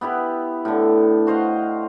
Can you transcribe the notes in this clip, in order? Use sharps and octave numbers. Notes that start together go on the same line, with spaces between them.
B3 E4 G4 B4
A2 D3
F#4 C5 D#5 F5